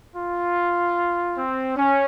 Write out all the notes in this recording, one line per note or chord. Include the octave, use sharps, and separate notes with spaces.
F4
C4
C#4